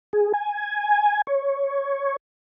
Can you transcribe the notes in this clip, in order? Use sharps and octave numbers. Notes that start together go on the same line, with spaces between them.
G#4
G#5
C#5